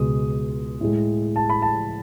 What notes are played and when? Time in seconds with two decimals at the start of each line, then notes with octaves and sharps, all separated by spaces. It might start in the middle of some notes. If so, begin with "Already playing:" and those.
Already playing: C#2 B2 G#3 D#6
0.81 A2 G#3
1.36 A5
1.50 B5
1.62 A5